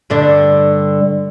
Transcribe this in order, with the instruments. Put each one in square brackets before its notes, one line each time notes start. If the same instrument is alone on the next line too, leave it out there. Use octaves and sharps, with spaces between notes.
[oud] G2 D3 D4